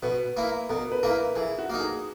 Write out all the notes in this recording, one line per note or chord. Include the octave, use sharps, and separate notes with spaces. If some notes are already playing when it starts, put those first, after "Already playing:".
B2 B4
A#3 E4
B2 A#4
B4
A#3 E4 A#4
E3 G#4
F#4
A#3 D#4
G#4